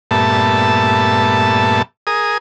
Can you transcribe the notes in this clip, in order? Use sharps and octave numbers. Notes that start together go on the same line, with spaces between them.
G2 A#2 A3 B3 E5 A5
G#4 A#4 D#6